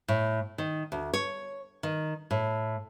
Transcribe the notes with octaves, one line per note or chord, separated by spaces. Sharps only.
A2
D#3
D2
C#5
D#3
A2